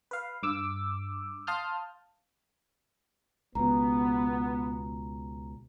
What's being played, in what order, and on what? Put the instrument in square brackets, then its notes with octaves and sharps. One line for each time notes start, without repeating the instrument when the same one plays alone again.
[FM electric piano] B4 F5
G2 D6 E6
F5 A5 C6 D#6 F6 G6
[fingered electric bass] C#2 B2 [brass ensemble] B3 [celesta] A#5